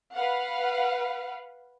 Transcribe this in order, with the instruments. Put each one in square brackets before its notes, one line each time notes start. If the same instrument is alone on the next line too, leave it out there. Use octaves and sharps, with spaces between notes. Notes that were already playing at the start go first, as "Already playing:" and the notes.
[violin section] B4 F5 F#5